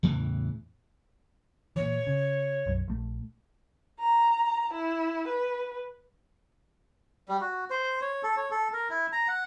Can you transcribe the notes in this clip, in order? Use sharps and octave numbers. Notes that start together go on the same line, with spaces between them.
E2 A2 C#3 E3
A#2 E3 C#5
C#3
B1 F#2
A#1 A3
A#5
E4
B4
G3
F#4
C5
C#5
A4
C#5
A4
A#4
E4
A#5
F#5